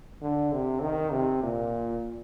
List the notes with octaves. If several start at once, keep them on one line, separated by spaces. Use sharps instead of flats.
D3
C3
D#3
C3
A#2